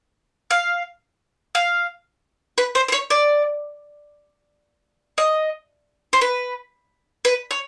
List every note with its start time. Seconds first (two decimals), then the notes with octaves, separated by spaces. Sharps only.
0.51 F5
1.55 F5
2.58 B4
2.75 C5
2.88 C5
2.92 C#5
3.10 D5
5.18 D#5
6.13 C5
6.21 B4
7.25 B4
7.51 C#5